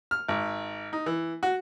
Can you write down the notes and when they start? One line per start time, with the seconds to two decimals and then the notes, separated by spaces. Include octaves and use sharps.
0.11 F6
0.28 G#1
0.93 D#4
1.06 E3
1.43 F#4